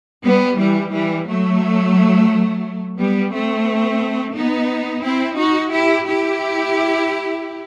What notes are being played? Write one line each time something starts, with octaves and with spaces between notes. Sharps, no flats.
G3 B3
E3 G3
E3 G3
F#3 A3
G3 B3
A3 C4
B3 D#4
C4 E4
D#4 F#4
E4 G4
E4 G4